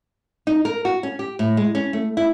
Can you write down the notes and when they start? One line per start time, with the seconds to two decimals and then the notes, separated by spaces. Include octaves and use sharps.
0.47 D#4
0.65 A#4
0.85 F#4
1.03 C#4
1.19 G4
1.39 A2
1.57 G#3
1.75 C#4
1.93 A3
2.17 E4